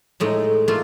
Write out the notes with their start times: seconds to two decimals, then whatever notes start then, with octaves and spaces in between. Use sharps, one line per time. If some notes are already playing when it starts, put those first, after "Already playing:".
0.20 A2 G#3 A3 D#4
0.68 A3 A#3 F4